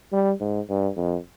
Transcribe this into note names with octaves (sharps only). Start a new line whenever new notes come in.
G3
G#2
G2
F2